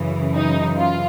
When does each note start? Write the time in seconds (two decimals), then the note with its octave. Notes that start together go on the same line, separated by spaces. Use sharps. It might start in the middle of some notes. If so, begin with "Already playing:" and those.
Already playing: F#2 C#3 E3
0.34 D#4
0.77 F4